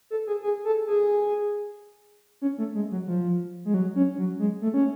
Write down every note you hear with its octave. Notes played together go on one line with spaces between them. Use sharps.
A4
G#4
G#4
A4
G#4
C#4
A3
G#3
F#3
F3
G#3
F#3
C#4
F#3
G#3
A3
C#4